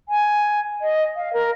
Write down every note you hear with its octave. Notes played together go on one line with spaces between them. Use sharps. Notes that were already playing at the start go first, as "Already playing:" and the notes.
G#5
D#5
F5
A#4